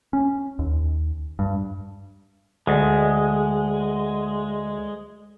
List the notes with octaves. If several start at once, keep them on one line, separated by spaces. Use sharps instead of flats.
C#4
D#2
G2
D2 G#3